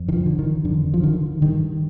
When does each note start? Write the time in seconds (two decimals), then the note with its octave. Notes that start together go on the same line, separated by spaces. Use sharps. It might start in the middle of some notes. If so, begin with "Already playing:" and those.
Already playing: F2
0.08 D#3
0.13 F3
0.26 D3
0.39 D#3
0.64 F2 D3
0.94 F3
1.03 D3 D#3
1.42 G2 D#3